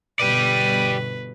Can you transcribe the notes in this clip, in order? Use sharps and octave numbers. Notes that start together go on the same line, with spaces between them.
G1 B2 G4 B4 D5 D#7